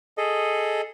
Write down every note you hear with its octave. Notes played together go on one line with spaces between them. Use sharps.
G#4 A4 D#5